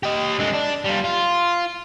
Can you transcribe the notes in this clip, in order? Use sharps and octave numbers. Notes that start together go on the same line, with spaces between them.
G4 D#5
D3 G#3
D4
G3 F4
F4